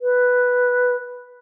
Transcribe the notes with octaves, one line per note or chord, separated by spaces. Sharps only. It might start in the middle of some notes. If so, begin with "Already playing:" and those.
B4